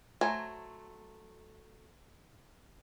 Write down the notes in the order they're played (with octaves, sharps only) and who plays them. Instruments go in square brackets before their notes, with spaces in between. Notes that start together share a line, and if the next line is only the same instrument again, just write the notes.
[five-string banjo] F#3 A3 C5 G#5 A#5